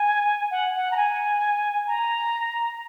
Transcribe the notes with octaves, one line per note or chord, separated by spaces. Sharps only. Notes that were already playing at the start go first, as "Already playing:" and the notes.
Already playing: G#5
F#5
F#5
A#5
G#5
A#5